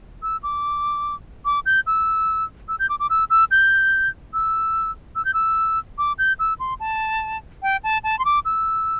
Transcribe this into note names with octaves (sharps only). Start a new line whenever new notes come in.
E6
D6
D6
G6
E6
E6
G6
D6
D6
E6
E6
G6
E6
E6
G6
E6
D6
G6
E6
C6
A5
G5
A5
A5
C6
D6
E6